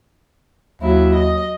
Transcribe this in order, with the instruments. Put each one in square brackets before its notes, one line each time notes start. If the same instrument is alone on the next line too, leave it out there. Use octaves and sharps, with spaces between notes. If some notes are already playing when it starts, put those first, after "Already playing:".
[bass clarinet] D#2 [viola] F#3 E4
[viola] D#5